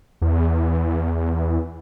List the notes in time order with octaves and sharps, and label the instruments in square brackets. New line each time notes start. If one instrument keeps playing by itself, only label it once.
[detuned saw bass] E2